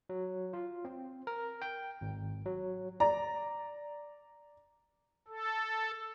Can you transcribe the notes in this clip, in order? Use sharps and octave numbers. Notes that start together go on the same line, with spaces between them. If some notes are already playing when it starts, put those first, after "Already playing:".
F#3
F4
C4
A#4
G5
G#1
F#3
D5 A#5
A4